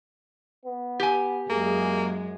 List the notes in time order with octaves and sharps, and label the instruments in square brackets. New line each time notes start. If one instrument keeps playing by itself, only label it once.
[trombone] B3
[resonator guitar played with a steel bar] G4 G#5
[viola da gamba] F#2 G#3 [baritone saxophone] A#3 [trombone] G#4